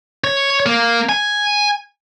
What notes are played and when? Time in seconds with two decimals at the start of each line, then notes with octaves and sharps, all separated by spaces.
0.24 C#5
0.66 A#3
1.09 G#5